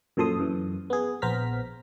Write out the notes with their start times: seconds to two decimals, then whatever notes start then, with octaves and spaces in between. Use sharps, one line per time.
0.17 F#2 A#2 F3 A4 C6 D#6
0.39 F#2 E3
0.90 B3 G#4
1.22 A#1 B3 C5 A#5 F6 B6